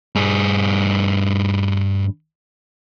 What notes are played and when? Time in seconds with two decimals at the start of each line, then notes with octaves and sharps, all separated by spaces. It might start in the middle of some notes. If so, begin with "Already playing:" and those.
0.15 G2 G#4